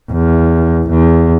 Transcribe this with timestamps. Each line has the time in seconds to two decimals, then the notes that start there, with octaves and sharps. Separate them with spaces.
0.11 E2
0.89 E2